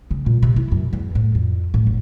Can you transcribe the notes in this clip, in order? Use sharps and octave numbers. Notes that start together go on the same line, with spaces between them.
C#3
A#2
C3
E4
F#2
E2
A2
F2
A2
G1